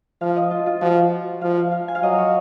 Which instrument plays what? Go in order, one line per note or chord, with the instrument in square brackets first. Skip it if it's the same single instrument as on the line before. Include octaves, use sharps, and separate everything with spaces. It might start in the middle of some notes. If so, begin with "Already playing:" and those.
[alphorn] F3 [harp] F5
[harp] D#5
F4
F4
[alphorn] F3 [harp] F#4
[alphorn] F3 [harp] F5
[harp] F5
F5
G#5
F5
[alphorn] F#3 [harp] D#5
[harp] C#5